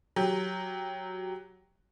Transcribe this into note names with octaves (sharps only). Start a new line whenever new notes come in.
F#3 G4